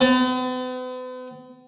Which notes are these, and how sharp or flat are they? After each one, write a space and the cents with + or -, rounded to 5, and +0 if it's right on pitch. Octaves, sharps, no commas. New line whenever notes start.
B3 +45